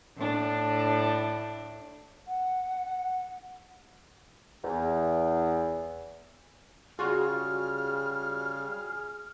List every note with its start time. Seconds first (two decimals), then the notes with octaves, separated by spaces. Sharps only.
0.16 A2 D4
2.28 F#5
4.64 E2
6.99 C#3 G3 F4 F#4 G#4 F6